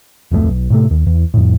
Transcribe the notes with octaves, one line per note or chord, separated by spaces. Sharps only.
D1 F2 E3 A3
B1
A2 C3 A3
D#2
E2
F2 A2